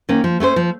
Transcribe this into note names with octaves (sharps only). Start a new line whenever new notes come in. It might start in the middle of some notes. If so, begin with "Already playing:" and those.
D#3 A#3 C#4
F3
A3 C#4 A4 C5
F3